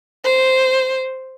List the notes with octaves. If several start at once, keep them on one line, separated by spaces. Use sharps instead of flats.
C5